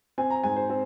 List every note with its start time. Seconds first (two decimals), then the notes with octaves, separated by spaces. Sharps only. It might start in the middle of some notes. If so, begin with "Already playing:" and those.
0.18 C4 G#5
0.30 A#5
0.44 G#2 G#5
0.56 C5
0.70 C4